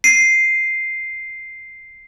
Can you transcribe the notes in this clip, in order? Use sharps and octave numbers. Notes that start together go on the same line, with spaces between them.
C7 D#7